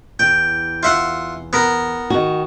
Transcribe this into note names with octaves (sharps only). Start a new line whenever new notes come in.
E2 G5
F4 E5 F#5
B3 A#4
D#3 F#4